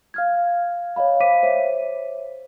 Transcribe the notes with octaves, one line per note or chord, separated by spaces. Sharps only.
F5 F6 G#6
C#5 D#5 F5 B5
C5 F5 D6 B6 D#7
C5 C#5 E5